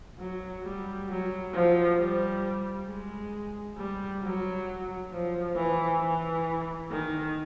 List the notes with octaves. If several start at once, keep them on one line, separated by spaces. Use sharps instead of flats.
F#3
G3
F#3
F3
G3
G#3
G3
F#3
F3
E3
E3
D#3